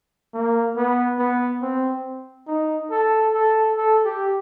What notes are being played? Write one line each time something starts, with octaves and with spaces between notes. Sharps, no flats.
A#3
B3
B3
C4
D#4
A4
A4
A4
G4